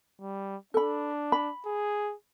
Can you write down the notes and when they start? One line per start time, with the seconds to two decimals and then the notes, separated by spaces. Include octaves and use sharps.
0.20 G3
0.74 D4 A4 B5
1.32 B5
1.66 G#4